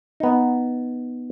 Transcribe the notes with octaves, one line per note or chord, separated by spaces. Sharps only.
B3 D#4